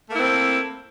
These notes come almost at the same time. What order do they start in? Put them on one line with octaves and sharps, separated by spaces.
A3 A#3 E4 C4